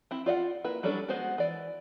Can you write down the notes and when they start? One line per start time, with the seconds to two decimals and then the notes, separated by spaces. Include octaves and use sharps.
0.11 C4 E4
0.26 F4 D5 D#5 F#5
0.64 A#3 E4 B4
0.83 F#3 G3 C#4 D4 A4
1.08 G#3 B3 F#4 C5
1.38 E3 D5